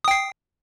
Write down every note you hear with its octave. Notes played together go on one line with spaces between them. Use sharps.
G5 D#6 C7